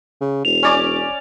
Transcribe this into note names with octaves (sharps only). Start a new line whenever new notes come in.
C#3
E1 F7
C#4 D5 D6